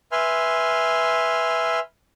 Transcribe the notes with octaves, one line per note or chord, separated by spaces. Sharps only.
B4 E5 G#5 C6 F6